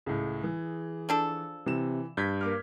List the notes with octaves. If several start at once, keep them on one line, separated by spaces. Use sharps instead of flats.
C#2 A2 G#4
E3
F3 D4 A4
C3 E3 E7
G2 G6 G#6 B6
A#3 D6 F6